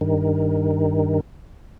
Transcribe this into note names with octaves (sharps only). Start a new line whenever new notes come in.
G2 D#3